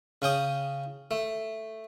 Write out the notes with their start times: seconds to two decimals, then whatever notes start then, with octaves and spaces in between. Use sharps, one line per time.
0.22 C#3 C#4 G5 D#6
1.11 A3